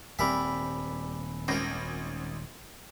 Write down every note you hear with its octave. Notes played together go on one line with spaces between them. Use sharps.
D#1 G3 C4 A#4 E5 G#5 B5 E6
G#1 C#4 A#4 C5 A#6